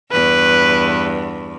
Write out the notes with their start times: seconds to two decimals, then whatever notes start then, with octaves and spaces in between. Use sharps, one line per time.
0.12 E2 G2 B4